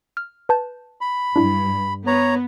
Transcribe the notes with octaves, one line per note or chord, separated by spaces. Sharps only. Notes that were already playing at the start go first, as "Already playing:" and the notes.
F6
B4 A5 G6
B5
G2 D4 E4
B3 C#5 A#5